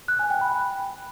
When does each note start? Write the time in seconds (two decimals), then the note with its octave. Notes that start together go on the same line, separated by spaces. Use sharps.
0.08 F#6
0.19 G#5
0.30 G5
0.41 B5